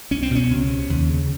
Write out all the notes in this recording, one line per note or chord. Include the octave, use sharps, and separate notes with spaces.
C2 C#4
C4
B2 C#4
C#2
C3
D#2
C#3